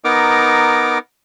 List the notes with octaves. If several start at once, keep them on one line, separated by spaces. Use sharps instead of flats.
B3 D#4 A#4 D6